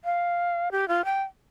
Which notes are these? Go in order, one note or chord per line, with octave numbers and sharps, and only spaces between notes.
F5
G4
F4
G5